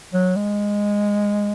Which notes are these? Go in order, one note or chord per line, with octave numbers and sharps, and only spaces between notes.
F#3
G#3